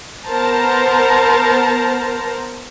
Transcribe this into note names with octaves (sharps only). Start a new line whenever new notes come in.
B3 A#4 C5 A5 A#5